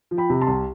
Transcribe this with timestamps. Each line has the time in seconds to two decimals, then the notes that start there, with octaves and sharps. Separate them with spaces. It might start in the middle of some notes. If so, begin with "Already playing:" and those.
0.11 F3
0.18 G5 B5
0.30 C3
0.41 A5 C6
0.47 C2